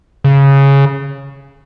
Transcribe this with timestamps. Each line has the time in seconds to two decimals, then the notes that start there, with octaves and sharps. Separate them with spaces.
0.25 C#3